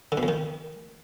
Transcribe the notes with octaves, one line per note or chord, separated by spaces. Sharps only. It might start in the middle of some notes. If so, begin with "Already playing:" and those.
D3
B2
F2
D#3